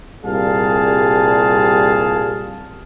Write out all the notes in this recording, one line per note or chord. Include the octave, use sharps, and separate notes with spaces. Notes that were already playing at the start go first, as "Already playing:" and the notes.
C2 A#2 G3 G#4 F5 A5